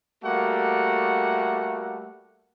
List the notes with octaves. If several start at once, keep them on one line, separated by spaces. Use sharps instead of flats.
G3 A3 A#3 F#4 F#5